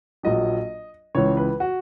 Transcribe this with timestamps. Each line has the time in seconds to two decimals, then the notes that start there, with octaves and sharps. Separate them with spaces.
0.23 A#1 A#2 F#3 D#5
1.15 C#2 C#3 E3 C#5
1.37 B4
1.60 F#4